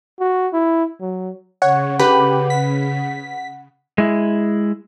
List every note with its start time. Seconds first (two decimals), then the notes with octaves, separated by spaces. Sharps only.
0.20 F#4
0.53 E4
1.01 F#3
1.62 C#3 C#5 F#5
1.99 G4 B4
2.50 B6
3.98 G#3 E4